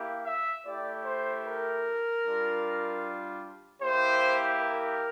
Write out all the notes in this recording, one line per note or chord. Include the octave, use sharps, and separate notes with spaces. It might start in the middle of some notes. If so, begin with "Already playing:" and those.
Already playing: A#3 E4 G4
E5
A3 E4 G4 D5
C5
A#4
G3 D4 F4
A#3 E4 G4 C5
A#4